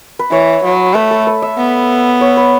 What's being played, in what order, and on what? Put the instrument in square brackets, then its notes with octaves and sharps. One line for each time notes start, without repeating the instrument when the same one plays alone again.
[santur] B4
[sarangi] E3 [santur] C#5
[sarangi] F#3
[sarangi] A3 [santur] B4
[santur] A4
B4
E5
[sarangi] B3
[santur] C#5
B4